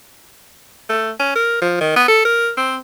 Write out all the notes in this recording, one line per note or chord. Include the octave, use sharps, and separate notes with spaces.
A3
C#4
A#4
F3
D#3
B3
A4
A#4
C4